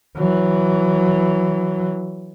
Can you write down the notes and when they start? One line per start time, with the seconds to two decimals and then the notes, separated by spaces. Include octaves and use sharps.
0.17 E3 F#3